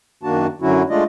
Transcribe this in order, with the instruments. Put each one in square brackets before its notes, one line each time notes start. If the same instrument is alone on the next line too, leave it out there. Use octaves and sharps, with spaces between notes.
[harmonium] F#2 D#3 A#3 D4 F#4 A5
F#2 D3 F#3 C#4 E4 F#4
G#3 A3 D4 F4 D5 D#5